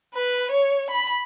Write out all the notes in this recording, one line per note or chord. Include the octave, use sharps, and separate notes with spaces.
B4
C#5
B5